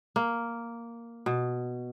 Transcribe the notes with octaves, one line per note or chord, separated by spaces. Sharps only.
A#3
B2